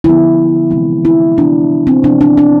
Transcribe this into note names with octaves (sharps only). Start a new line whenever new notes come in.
D3 F3 B3 E4
C3 E3 G#3 C4
E4
C3 E3 B3 D4
C4
C3 F3 B3 D4
D4
D4